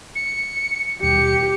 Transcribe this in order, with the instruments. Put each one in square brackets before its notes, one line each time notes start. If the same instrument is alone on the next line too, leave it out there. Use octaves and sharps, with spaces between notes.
[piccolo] C#7
[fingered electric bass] D#2 B2 G3 [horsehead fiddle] G4 [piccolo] C#7